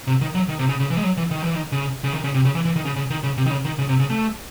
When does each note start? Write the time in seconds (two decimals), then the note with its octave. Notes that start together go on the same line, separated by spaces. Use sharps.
0.07 C3
0.21 D#3
0.35 F#3
0.49 D#3
0.59 C3
0.69 C#3
0.80 C#3
0.90 E3
0.97 G#3
1.04 F#3
1.17 E3
1.31 D#3
1.42 E3
1.55 D#3
1.72 C#3
2.04 C#3
2.13 D#3
2.24 C#3
2.34 C3
2.45 C#3
2.55 E3
2.65 E3
2.76 D#3
2.85 C#3
2.96 C#3
3.10 D#3
3.24 C#3
3.37 C3
3.46 D#3
3.51 C#3
3.65 D#3
3.79 C#3
3.89 C3
3.99 C#3
4.10 A3